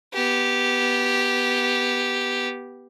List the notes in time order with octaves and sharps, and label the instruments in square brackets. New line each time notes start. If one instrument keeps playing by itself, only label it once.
[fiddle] B3 G4